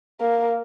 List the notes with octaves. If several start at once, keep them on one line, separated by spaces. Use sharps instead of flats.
A#3